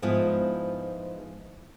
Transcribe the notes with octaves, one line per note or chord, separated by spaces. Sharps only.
G#2 F3 B3 E4 F4